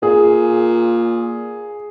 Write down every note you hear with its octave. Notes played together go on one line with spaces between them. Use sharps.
A#2 G#4